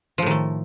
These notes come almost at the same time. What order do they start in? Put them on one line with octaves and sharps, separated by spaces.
F3 A2 D#3 A3